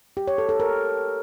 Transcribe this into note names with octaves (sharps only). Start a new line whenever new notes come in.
G4
C#5
A4
A4
A#4